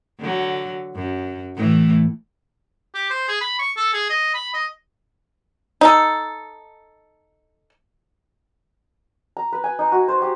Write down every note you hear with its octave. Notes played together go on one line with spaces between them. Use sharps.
D3 F#3
F#2
A2 E3 A3
G4
C5
G#4
B5
C#6
A4
G#4
D#5
B5
D#5
D#4 A4
A#5
B4
G#5
D#4
F#4
C5
G4